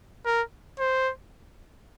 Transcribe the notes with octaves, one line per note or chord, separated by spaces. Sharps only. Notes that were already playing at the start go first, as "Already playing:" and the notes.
A#4
C5